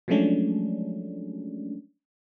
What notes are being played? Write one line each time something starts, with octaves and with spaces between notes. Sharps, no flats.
F3 F#3 G#3 A3 C#4 D4